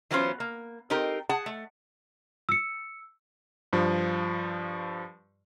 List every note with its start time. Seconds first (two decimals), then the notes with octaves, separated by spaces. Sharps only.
0.11 E3 F#3 B3 C#4 F4 C5
0.40 A#3
0.90 C4 D#4 G4 A4 A#4
1.29 G#4 F#5 A5
1.46 A3
2.49 E6 C#7
3.73 G2 F3